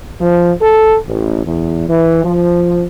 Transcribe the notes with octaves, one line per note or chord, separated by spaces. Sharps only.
F3
A4
A1
E2
E3
F3